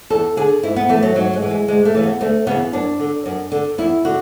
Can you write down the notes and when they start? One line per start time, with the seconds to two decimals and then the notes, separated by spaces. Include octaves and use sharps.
0.10 E2 A4
0.37 D3 G#4
0.63 G#2 E4
0.76 B3
0.89 E3 A3
1.03 F#3
1.15 G#2 F#3
1.33 G#3
1.42 E3
1.51 G#3
1.68 D2 G#3
1.85 A3
1.94 C#3 E3
2.03 B3
2.21 D2 A3
2.47 C#3 E3 B3
2.73 F#2 D4
3.00 D3
3.26 F#2
3.52 D3
3.78 E2 E4
4.05 D3 F#4